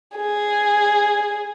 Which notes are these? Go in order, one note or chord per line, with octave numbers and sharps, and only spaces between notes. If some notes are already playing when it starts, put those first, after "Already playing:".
G#4